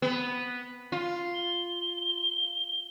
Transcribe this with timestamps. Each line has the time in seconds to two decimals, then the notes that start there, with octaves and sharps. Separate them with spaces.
0.02 B3
0.92 F4
1.35 G7